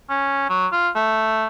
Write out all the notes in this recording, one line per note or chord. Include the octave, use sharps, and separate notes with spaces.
C#4
F#3
F4
A3